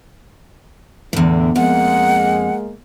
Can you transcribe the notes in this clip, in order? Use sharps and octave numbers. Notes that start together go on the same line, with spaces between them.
E2 A2 D3
F2 G#3 A#3 F#5